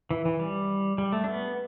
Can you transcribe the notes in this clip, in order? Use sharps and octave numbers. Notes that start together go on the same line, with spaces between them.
E3
E3
G3
G3
A3
D4
B3